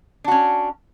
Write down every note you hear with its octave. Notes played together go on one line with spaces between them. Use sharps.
C#4 D4 F#4